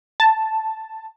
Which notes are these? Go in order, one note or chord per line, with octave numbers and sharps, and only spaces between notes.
A5